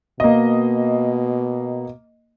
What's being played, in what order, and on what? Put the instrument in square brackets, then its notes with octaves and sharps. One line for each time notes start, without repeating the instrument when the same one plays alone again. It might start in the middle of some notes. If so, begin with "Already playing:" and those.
[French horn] B2 [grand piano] A#3 D#5